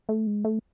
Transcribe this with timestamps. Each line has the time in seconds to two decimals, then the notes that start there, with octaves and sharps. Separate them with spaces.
0.09 A3
0.27 G#3
0.45 A3